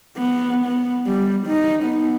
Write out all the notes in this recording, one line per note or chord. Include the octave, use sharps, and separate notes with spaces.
B3
B3
G3
D#4
B3